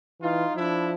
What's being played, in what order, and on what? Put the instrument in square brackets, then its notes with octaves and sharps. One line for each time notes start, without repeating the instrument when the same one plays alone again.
[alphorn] E3 [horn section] D#4 F4
[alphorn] F3 [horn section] D4 E4